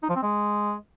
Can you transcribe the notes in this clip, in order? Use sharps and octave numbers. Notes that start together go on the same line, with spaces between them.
D#4
F3
C4
G#3